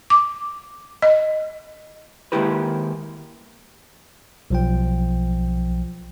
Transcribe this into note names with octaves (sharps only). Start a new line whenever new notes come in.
D6
D#5
D#3 G#3 A#3 E4 G4 B4
B1 F3 G5